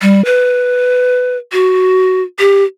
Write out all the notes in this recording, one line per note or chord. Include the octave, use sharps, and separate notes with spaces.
G3
B4
F#4
G4